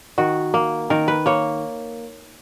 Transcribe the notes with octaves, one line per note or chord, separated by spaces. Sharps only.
D#3 F#4
A#3
D#3 A#4
B4
A#3 C#5